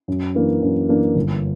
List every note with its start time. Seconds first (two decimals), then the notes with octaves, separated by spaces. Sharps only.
0.08 F#2
0.35 E3 A#3 D4
0.63 F#2
0.89 E3 A#3 D4
1.16 G1